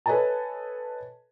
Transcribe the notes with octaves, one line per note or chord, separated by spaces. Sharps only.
A4 B4 C#5 D#5 G#5 A5